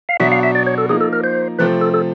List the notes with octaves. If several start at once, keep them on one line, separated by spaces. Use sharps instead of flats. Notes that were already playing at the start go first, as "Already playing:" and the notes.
F5
B2 F#3 B3 D4 E5
F5
E5
D5
C#5
A4
F3 A#3 D#4 G#4
A4
A#4
C5
C3 F3 A3 C4 B4
A4
A4